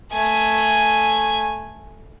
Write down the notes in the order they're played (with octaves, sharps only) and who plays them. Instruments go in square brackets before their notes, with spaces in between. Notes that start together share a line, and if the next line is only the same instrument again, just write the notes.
[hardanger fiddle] A3 G#5